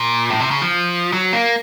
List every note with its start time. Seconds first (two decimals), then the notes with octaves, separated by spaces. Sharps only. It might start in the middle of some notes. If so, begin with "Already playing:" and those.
Already playing: A#2
0.30 A2
0.40 C3
0.51 C#3
0.61 F3
1.13 F#3
1.33 A#3